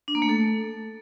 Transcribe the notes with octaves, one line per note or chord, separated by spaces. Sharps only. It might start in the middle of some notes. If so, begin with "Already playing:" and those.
D4
A#3
A3
A4